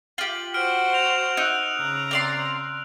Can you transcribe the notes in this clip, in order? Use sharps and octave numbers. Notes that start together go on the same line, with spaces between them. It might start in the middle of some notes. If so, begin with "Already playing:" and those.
F4 G4 F#7
F#4 C5 F6 D7
F7
D#4 E6 F#6
C#3 A#5
C4 D5 C6